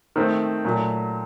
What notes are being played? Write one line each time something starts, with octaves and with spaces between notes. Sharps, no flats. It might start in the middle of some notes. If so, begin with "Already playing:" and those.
D#3 A3 C4
A#2 F#3 A3